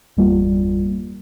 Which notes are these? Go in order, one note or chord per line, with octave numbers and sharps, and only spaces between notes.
G1 E2 G3 A#3 F4